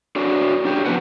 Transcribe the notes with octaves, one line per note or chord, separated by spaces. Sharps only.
D4 F#4 C#5
D4 G4 C#5
F3 B3 D4 D#4 B4 F#5